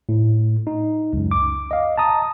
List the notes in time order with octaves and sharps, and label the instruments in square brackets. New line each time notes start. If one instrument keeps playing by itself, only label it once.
[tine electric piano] A2
D#4
C#2 F#2
D6
D#5 F5
A5 A#5 D#6